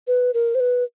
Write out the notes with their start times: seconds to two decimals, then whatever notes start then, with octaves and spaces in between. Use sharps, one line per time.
0.07 B4
0.34 A#4
0.55 C5
0.60 B4